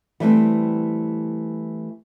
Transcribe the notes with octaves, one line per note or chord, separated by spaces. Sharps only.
E3 G3 A3 C4